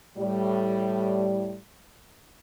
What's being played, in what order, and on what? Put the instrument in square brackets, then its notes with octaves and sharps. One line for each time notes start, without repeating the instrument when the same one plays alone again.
[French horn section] A2 G3